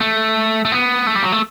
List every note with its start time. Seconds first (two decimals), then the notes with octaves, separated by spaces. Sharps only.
0.01 A3
0.65 A3
0.72 B3
1.07 A3
1.15 G3
1.23 F#3
1.32 A3